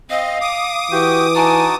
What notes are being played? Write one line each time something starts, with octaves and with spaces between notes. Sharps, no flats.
C4 D#5 F5
D6 D#6
E3 F#4 G4
D#4 F#4 G#5 A5